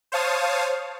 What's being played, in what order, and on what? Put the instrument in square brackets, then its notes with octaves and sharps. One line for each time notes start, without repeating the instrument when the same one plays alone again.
[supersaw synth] C5 C#5 F5 A5 D#6